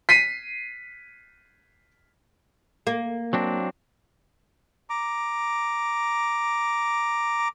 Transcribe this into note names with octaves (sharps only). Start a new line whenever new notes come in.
B6 C7 D#7
A#3
F#3 C4 D4
A#5 D6